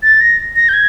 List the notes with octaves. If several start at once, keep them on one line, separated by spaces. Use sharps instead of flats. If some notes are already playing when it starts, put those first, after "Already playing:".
A6
A#6
A#6
G6
G#6